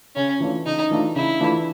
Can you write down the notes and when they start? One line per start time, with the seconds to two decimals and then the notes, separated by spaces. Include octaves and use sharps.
0.15 C#3 C#4
0.40 E3 A3 D4 F4
0.65 C#3 D#4
0.91 E3 A3 D4 F4
1.15 C#3 E4
1.40 E3 A3 D4 F4